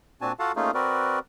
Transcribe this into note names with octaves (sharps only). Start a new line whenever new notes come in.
A#2 C4 D4 F#4 G#5 A5
F4 F#4 A4 F5 F#5 A5
A3 A#3 C#4 D#4 F4 G#4
C4 F#4 A#4 B4 D5